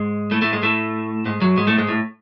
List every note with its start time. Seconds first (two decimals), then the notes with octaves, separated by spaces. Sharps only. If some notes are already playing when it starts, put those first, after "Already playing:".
Already playing: G#2 G#3
0.31 A2 A3
0.42 A2 A3
0.52 G#2 G#3
0.63 A2 A3
1.26 G#2 G#3
1.41 F#2 F#3
1.57 G#2 G#3
1.67 A2 A3
1.78 G#2 G#3
1.89 A2